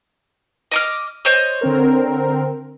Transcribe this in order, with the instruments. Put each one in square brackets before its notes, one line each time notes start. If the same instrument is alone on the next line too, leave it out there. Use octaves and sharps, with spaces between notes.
[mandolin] D#5 D6 F6
C5 C#5 D#5
[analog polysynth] D3 C4 A#4